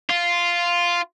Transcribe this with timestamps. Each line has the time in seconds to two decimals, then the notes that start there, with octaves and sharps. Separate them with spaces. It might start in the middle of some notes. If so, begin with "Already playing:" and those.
0.09 F4